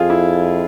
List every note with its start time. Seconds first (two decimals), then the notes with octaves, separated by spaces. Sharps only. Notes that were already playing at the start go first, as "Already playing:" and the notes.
Already playing: F2 F4 G#4
0.10 E4